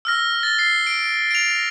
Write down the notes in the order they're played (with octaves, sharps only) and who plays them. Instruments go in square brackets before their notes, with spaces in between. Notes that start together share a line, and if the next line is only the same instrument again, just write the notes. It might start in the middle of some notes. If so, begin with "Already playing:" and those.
[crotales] E6 F6 A#6
A6 G7
C7
D7
D7 F7
A#6